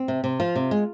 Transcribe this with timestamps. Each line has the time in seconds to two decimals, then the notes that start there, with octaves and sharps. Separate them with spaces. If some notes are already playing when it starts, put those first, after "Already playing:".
Already playing: C4
0.08 C3
0.24 C3
0.40 F3 F4
0.56 C3
0.71 G#3